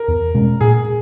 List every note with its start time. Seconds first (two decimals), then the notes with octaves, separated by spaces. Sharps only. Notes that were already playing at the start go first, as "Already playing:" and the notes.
Already playing: A#4
0.08 E2
0.34 B2 G#3 C#4
0.61 A#2 G#4